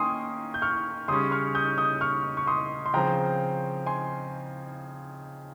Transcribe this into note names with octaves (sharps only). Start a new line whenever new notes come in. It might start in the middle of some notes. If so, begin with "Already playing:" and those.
Already playing: D#3 A#3 C#4 G5 G#5 C6 D#6
G6
C#6 F6
C#3 G3 C#4 C6 D#6
C#6 F6
D#6 G6
D#6 G6
C#6 F6
C#6
C6 D#6
C6
C#3 F3 C4 G5 A#5
G#5 C6